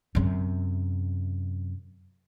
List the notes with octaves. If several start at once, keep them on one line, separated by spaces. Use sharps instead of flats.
F#2 C3